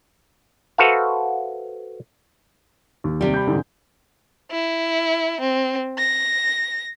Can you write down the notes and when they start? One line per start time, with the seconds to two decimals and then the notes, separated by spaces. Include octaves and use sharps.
0.78 F#4 A4 B4 C5 E5 F5
3.04 D#2
3.21 C3 G3
3.34 B5 G6
3.47 G#2 D3 E3
4.51 E4
5.40 C4
5.98 A#6